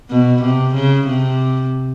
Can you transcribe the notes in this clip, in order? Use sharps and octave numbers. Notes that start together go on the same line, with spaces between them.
B2
C3
C#3
C3